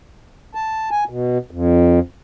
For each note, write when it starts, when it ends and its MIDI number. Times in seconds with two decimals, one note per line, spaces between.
0.55 0.89 81
0.91 1.04 80
1.09 1.38 47
1.51 1.99 41